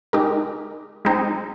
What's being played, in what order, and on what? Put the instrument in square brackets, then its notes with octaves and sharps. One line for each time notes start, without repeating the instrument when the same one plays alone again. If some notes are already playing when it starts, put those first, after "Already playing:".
[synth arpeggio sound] G#3 D#4 G4 A#4
G#3 C4 D#4